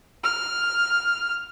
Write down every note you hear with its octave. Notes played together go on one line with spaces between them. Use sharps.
F6